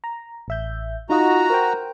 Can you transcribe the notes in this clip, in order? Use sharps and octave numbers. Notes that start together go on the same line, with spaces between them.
A#5
A1 E5 G6
D#4 F4 F#4 D#5 A#5
A#4 C5 G5